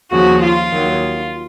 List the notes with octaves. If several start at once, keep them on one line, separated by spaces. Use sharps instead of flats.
D#2 C#3 F3 F#4
F4
D#2 D#3 F#3